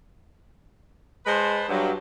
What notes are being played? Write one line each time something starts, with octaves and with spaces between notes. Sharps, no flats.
G#3 B4 C5 A5 C6
G2 F#3